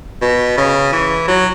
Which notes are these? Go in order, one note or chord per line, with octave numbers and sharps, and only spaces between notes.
B2
C#3
E3
F#3